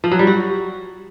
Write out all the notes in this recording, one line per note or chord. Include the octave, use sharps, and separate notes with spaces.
F3
F#3
G3
F#4